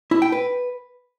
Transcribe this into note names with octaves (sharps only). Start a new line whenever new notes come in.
E4
G5
B4